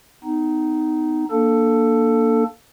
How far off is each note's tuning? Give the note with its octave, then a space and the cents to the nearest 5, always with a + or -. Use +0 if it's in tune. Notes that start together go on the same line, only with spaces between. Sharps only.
B3 +40 D#4 +0
A#3 +0 D4 +0 A4 +10